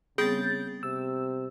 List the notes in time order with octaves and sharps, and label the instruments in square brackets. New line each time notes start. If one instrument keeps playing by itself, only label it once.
[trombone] C#3 [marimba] G3 B3 C4 [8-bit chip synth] G#4 [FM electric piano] G6 A6
[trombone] C3 [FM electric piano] E6